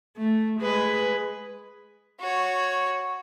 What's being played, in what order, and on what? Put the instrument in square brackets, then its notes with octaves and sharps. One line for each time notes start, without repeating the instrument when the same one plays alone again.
[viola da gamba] A3
G#3 G#4 B4
[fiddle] F#4 C#5